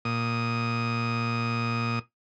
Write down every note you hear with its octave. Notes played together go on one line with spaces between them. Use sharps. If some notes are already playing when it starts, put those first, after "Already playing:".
A#2 D#6